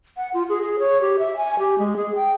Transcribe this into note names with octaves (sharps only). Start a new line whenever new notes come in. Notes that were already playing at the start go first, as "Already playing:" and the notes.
F#5
F4
G#4
G#4
C#5
G4
E5
G#5
G4
G#3
G#4
G5